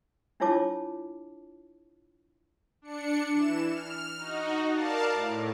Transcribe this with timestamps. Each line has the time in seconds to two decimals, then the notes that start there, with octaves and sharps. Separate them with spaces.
0.40 D4 E4 F4 C#5 A5 D6
2.82 D4 C#7
3.32 E3 E7
3.69 F6
4.18 D#4 F#4
4.71 A#4 D5 F5 A5
5.12 A2